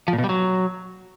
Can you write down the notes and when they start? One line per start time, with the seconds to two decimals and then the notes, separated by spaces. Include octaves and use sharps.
0.08 F3
0.13 A#2
0.18 B2
0.24 G3
0.29 F#3